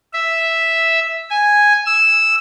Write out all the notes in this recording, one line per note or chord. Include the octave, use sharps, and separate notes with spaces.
E5
G#5
E6